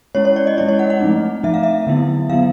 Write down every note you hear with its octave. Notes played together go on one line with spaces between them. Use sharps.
G#3 C#4 E4 C#5
C#5
D5
D#5
G#3 C#4 E4 D5
C#5
F#5
F#5
F3 A3 C4 D#4
F3 A3 C4 D#4 E5
F5
E5
D3 F#3 B3 E4
D3 F#3 B3 E4 F5